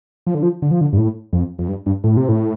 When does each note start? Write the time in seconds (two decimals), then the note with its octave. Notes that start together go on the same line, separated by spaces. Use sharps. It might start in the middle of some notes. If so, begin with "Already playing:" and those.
0.27 F3
0.35 D3
0.43 F3
0.62 D3
0.71 F3
0.81 D3
0.93 G2
0.97 A2
1.33 F2
1.59 F2
1.68 G2
1.86 G2
2.04 A2
2.17 C3
2.29 A2